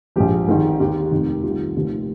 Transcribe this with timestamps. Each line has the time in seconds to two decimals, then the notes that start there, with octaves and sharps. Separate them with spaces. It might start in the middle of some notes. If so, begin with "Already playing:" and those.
0.16 A#1 G#2 F3 G4
0.48 G#1 G#2 D#3
0.80 D#2 D#3 G4
1.12 F1 F2 D#3
1.43 C2 C3 D#3 F4
1.75 F1 D#2 D#3